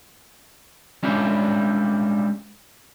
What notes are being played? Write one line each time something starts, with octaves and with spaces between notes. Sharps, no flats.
G3 G#3 C#4 D4 E4